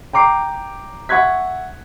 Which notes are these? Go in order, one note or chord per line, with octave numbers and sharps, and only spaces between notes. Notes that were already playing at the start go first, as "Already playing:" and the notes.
G5 A#5 D6 C7
E5 F#5 C#6 F#6 G#6 B6